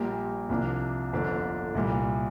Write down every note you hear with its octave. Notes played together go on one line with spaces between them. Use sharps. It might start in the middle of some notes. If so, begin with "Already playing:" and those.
Already playing: A#1 A#2 G3 A#3 G4
C2 C3 F3 A#3 D4
G1 F2 D3 A#3 D4
C2 A#2 G3